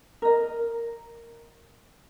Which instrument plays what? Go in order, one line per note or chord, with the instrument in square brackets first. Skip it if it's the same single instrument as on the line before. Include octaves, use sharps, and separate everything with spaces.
[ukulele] A#4 D#5